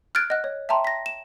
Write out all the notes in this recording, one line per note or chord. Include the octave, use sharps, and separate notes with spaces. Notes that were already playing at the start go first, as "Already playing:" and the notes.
F6 F#6 G#6 A6 D7
D#5 F#5 F#6
C#5
E5 G5 A5 A#5 C6
A#6 B6
E7